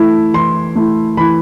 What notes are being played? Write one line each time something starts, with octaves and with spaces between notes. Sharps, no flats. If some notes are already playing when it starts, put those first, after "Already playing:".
Already playing: E3 A3 E4
E3 C6
A3 E4
E3 B5